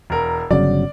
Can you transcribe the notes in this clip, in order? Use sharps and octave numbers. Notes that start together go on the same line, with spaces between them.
E1 A#4
G1 C#3 F#3 D5